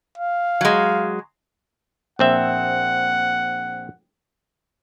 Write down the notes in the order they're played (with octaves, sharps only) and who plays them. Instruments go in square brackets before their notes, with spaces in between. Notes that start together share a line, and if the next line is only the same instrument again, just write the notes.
[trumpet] F5
[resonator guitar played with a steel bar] F#3 G#3
[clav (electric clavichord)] A#1 C4 E5 [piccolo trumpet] F#5